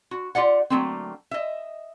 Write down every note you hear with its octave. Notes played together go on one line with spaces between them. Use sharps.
F#4
F4 G4 D5 F#5
D3 F#3 A3 A#3 C4
D#5 E5